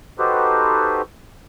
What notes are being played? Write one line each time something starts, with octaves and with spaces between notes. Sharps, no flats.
D#4 F#4 G4 A4 B4 C5